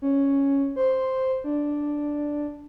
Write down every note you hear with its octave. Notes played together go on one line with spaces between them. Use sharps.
C#4
C5
D4